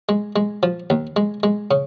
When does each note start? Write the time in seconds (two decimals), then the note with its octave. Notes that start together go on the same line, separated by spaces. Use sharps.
0.09 G#3
0.36 G#3
0.63 F3
0.90 D#2
1.16 G#3
1.43 G#3
1.71 C#3